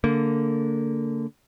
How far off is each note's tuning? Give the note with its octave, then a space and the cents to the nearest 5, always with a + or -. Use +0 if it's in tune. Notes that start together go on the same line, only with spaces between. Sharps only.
D3 -20 A#3 -25